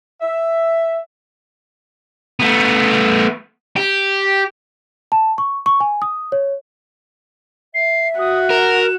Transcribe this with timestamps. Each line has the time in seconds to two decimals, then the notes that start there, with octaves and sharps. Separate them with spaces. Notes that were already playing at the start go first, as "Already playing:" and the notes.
0.21 E5
2.40 A3 B3
3.76 G4
5.12 A5
5.38 C#6
5.66 C#6
5.80 G#5
6.02 D#6
6.32 C#5
7.74 E5 C7
8.19 F#4 D#6
8.50 A#4 E7